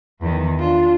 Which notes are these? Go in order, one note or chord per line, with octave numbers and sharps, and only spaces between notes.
E2 D#3
D4 F4